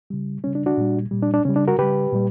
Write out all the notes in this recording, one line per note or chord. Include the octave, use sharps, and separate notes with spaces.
C#3 G3
C#3 G3 C#4
D4
D4 F#4
A#2 G3
A#2 G3
D4
D4
C#3 G3 C#4
D4
F#4 A#4
C#3 G3 G4 B4
A#2 G3